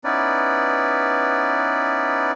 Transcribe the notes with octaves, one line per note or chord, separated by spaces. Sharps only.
B3 C#4 D#4 E4 B4 D5